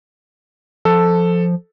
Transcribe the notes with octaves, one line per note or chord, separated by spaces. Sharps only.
F3 A4